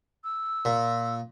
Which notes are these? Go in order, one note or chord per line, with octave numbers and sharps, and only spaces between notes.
E6
A#2